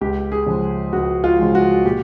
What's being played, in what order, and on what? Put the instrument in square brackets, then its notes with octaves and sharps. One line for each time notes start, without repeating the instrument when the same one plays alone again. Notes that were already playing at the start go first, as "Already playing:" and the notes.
[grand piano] C#2 G4
G#4
C#3 F3 G#3
C#2 F#4
F4
C#3 F3 G#3
F#4
A#2 G4